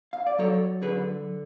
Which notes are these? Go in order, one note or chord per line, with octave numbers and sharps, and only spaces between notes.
F5
D5
F#3 A4 C#5
D3 G#4 B4